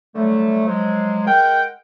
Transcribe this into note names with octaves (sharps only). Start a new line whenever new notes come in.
D3 F#3 G3 A3
F3 F#3 G#3
G#3 A#4 F#5 G5